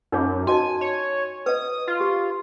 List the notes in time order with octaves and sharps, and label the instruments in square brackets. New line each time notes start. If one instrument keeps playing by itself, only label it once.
[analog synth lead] F#2 [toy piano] D#4 C#5 D6
[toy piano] F#4 D#5 A5 [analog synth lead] G#5
[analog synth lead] C#5
[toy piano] B4 D#5 [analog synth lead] D#6
[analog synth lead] F4
[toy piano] G4